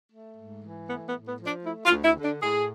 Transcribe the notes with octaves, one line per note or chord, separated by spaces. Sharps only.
A3
G#2
E3
A3 B3
B3
A2
B3
F3
D4
A3 E4
F4
D2
E4
D3
D4
A2 G#4